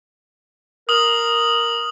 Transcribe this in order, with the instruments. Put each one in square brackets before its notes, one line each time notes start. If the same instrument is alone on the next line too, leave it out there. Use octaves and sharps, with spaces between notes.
[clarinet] A#4 [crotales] D#6 F#7